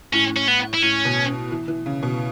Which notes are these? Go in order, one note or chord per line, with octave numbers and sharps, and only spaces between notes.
A2 C#4
C#4
B3
E4
A2 C#4
B2
E3
E3
C#3
B2